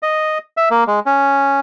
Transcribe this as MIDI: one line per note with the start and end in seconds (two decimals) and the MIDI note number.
0.03 0.38 75
0.57 0.69 76
0.71 0.84 58
0.87 1.00 56
1.06 1.60 61